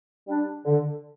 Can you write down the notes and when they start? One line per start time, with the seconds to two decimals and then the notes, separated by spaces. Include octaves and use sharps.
0.28 G3 D4
0.65 D3